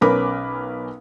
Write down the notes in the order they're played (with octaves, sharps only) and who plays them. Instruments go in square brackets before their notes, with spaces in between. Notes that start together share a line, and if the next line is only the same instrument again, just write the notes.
[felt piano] B1 C#4 A#4 B4 B5 D6